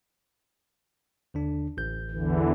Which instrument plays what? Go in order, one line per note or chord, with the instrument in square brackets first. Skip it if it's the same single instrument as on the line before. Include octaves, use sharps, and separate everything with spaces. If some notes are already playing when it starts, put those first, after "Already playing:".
[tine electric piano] D#2 D3 D4
A1 G6
[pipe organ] E2 D3 E3